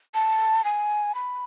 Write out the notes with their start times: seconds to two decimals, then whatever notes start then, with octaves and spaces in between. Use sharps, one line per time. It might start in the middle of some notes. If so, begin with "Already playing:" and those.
0.14 A5
0.64 G#5
1.15 B5